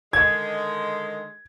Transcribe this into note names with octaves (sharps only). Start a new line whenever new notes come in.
D3 D#3 G#3 G#6